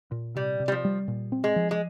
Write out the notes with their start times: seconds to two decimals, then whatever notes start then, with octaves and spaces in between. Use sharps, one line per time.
0.11 A#2
0.35 C3 G3
0.60 C3
0.68 G3
0.72 F3
0.85 G3
1.08 A#2
1.32 C4
1.44 G#3
1.56 F3
1.71 G#3